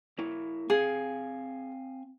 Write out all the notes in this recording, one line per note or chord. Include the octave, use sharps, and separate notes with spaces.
A#3 E4 A#4
C4 G#4 F5 G#5